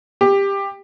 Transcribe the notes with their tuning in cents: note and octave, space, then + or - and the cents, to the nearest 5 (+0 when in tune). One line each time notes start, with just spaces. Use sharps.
G4 +15